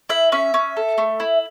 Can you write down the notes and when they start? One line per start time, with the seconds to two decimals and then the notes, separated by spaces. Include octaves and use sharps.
0.09 E4 E5
0.32 C#4 E5
0.54 C#4
0.77 A4
0.98 A3
1.20 E4